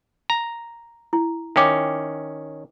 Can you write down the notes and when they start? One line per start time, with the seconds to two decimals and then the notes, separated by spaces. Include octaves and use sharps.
0.30 A#5
1.13 E4
1.56 D#3 C#4 E5 G5 D6